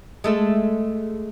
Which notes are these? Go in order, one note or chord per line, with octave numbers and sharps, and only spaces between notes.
G#3 A3 A4